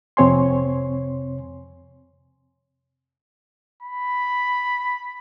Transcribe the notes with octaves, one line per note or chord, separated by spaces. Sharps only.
F2 C3 C4 C#5 G#5 C6
B5